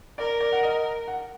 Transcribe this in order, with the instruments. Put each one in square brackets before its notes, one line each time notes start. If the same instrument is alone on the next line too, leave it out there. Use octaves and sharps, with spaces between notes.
[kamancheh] A#4 [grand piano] D5
[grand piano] D5
F#5
D#5
F#5